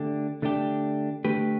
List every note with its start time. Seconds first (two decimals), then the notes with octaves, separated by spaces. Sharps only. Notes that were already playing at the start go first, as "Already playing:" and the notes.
Already playing: D3 A3 D4 G4
0.42 D3 A3 D4 G4
1.25 D3 A3 G4 B4